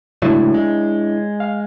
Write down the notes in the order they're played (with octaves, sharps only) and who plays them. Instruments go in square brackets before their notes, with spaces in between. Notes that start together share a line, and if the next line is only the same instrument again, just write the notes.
[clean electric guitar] C#2 A2 F#3 [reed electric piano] D4 E4 C#5
[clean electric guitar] G#3
[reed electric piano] F5